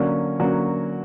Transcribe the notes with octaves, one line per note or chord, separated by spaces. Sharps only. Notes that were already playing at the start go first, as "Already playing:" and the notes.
Already playing: D3 F#3 A#3 C#4 F#4
D3 F#3 A#3 C#4 F#4